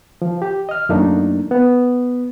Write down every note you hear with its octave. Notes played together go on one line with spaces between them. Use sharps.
F3
G4
D#5 F6
F#2 F#3 A3 A#3 D4 D#4
B3